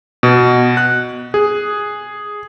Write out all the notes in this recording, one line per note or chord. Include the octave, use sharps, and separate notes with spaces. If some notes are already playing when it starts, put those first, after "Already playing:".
B2
F#6
G#4